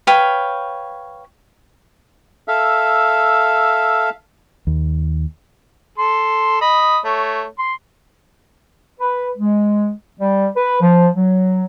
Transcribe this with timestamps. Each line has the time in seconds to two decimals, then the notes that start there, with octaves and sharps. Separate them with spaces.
0.07 B4 C#5 F5 G5
2.48 A4 E5 F5
4.67 D#2
5.98 A4 C6
6.61 D#5 B5 D#6
7.05 A3 C#5
7.59 C6
8.99 B4
9.37 G#3
10.20 G3
10.57 B4
10.81 F3
11.16 F#3